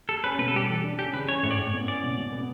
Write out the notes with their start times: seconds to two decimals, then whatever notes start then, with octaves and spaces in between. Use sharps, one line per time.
0.09 G4 A4
0.24 C#4 B4
0.38 B2 B4
0.48 A4
0.53 G3 G4
0.65 E3 A4
0.83 D4
0.99 C#4 G4
1.14 C#3 B4
1.28 C#4 C#5
1.43 A2 C#5
1.51 D5
1.58 A2 C#5
1.73 B3
1.88 C#4 D5
2.03 B2
2.18 B2
2.32 B3